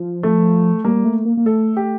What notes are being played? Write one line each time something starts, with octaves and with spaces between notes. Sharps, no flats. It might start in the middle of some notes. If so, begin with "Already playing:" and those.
Already playing: F3
A3
G3 A#3
A3
A#3
A#3
A3 A4
G4